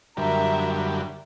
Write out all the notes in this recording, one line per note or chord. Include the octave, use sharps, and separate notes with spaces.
F#2 D3 G3 A#4 E5